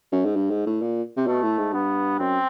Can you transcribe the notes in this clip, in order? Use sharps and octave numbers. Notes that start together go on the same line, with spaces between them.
F#2
G#2
G2
G#2
A2
A#2
C3
B2 A3
A2
G#2
G2 B3
F#2 C4